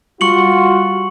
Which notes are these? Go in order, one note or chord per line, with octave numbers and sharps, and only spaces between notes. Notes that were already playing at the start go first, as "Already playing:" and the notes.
G3 F4 F#4 C#6 C#7 F#7